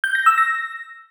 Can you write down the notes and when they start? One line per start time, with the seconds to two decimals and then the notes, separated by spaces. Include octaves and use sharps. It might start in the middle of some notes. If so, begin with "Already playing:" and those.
0.04 G6
0.15 A#6
0.26 E6
0.38 A#6